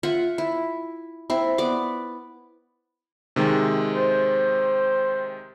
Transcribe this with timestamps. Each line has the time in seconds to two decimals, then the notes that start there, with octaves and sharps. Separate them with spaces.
0.03 F4 E5 F#5
0.38 E4
1.30 C4 E4
1.58 B3 D5 D6
3.36 C3 D#3 G#3
3.93 C5